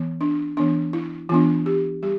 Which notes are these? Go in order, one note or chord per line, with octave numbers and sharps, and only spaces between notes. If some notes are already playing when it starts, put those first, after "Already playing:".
Already playing: E3 B3
D4
E3 B3 D4
E4
E3 B3 D4 F4
G4
G3 G4